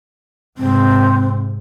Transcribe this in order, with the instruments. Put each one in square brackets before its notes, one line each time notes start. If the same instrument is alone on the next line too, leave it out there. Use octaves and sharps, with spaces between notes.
[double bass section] G#2 C3 [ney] C4